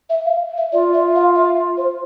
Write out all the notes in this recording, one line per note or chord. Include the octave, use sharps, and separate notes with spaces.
E5
F5
E5
F4 D5
E5
F5
E5
C5